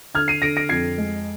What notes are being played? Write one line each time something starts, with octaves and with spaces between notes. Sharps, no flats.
D3 F6 G#6
C7 D#7
D3 A#6 D7
A#6 D7
F2 G#6 C7
G#3